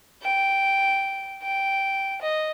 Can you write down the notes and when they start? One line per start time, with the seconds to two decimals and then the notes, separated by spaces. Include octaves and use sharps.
0.22 G5
1.42 G5
2.21 D#5